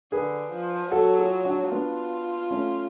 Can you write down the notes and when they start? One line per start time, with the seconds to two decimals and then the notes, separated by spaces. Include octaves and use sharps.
0.12 D3 G#4 B4
0.52 F3
0.92 F#3 F#4 A4
1.19 F4 G#4
1.45 D4 F#4
1.71 B3 D4 F4
2.51 A3 C#4